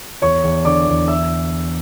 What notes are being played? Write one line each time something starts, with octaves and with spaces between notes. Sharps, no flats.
E2 C#5 C#6
E2
D3 D5 D6
E2
E5 E6